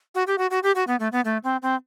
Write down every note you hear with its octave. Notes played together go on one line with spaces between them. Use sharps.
F#4
G4
F#4
F#4
G4
F#4
B3
A3
B3
A3
C4
C4